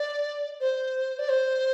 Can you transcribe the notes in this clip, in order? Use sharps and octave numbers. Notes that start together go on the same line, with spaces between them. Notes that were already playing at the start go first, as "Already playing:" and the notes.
Already playing: D5
C5
D5
C5